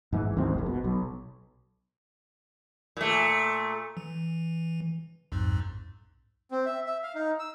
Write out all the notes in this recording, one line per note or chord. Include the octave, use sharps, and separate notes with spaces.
G#2 E3
G#1 D2 G#2 C4
F1 A#1
B2
B1
A#2 A3
E3
B1 F2 G#2
C4
E5
E5
F5
D#4
E6